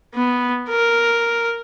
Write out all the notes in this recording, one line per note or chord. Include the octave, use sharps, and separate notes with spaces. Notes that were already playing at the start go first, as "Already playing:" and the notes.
B3
A#4